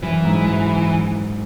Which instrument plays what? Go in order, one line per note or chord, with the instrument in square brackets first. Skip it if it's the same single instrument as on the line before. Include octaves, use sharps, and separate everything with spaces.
[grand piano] F#2 [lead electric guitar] E3
[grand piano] G#2